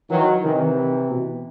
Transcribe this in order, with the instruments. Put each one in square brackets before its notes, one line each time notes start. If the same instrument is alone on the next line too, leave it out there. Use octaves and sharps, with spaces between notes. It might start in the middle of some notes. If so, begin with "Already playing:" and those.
[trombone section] D#3 F#3 [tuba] E3
[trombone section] C3 E3 [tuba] D#3
[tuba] B2